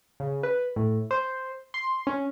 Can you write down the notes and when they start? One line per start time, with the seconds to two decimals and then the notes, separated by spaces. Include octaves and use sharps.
0.20 C#3
0.43 B4
0.76 A2
1.11 C5
1.74 C6
2.07 C#4